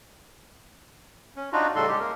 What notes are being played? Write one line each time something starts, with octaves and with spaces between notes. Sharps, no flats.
C#4
D4 D#4 F4 F#4
A2 C#3 G3 A4 C6
G#3 G4
A#3 A#4